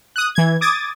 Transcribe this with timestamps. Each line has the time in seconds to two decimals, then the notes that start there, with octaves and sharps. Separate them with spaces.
0.16 D#6 F#6
0.35 E3 G#6
0.61 D6 D#6 G#6 A6